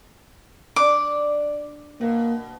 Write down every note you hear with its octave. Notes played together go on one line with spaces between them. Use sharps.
D4 D6
B2 A#3